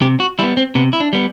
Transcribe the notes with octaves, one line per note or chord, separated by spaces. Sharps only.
C3 G4
F#4
G3 B3 E4
C4
C3 B3
E4
D4
G3 B3